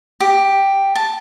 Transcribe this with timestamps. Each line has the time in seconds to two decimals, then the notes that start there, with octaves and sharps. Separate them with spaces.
0.20 G4
0.95 A5